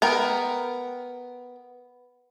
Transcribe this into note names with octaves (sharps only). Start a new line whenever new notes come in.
B3 A#4 G5